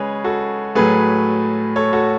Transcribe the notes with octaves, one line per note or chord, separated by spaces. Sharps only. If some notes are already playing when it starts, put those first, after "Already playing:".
Already playing: C#3 G#3 G#4 B4 C#5
F#4 A4
A2 F#3 A3 G#4 B4
A4 C#5
F#4 A4